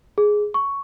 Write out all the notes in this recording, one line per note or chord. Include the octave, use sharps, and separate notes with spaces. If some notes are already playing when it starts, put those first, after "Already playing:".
G#4
C#6